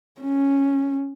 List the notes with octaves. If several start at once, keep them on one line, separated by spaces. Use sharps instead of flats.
C#4